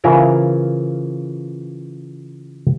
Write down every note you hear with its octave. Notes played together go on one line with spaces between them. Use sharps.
C#3 E3 E4 F4 A#4 C5